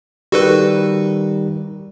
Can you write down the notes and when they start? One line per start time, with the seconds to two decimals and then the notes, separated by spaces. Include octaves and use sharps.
0.32 D#3 G3 F#4 A4 B4